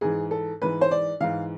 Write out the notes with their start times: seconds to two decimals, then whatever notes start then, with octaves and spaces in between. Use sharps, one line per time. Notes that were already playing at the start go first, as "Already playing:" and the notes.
0.01 G#2 E3 G#4
0.31 A4
0.62 G#2 E3 B4
0.81 C5
0.91 D5
1.21 G#2 E3 F5